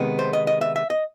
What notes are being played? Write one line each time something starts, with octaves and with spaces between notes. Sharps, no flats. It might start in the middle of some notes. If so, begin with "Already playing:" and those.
Already playing: C3 D#3 G#3 B3
C5
D#5
D#5
E5
E5
D#5